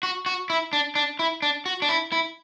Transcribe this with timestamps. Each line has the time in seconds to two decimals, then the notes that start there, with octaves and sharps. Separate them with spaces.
0.03 F#4
0.26 F#4
0.50 E4
0.73 D4
0.95 D4
1.19 E4
1.42 D4
1.66 F#4
1.82 D4
1.89 E4
2.12 E4